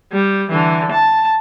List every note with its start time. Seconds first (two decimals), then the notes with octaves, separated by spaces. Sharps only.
0.13 G3
0.50 D3 E3
0.92 A5